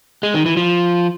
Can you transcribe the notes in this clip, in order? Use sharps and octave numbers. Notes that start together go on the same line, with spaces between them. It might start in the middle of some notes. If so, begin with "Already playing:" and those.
G#3
D#3
E3
F3